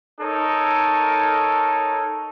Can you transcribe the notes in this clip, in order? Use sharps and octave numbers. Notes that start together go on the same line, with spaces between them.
D#4 A4 A#4 C#5